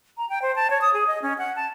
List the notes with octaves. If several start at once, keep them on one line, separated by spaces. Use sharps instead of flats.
A#5
G5
C5
A5
C#5
D#6
G#4
D#5
C#4
F#5
A5